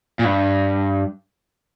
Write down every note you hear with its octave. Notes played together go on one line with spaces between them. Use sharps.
A#2
G2